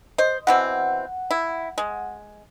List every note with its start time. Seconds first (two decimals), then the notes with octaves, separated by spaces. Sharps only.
0.18 C5 D#5
0.47 B2 E3 C4 F#5
1.31 E4
1.78 G#3